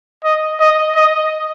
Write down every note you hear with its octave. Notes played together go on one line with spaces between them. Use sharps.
D#5
D#5
D#5